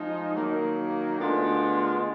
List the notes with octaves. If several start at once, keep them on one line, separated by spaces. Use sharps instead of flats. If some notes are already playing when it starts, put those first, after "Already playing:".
Already playing: F3 G#3 D#4
D#3 F#3 A#3
D2 D3 G#3 B3 F4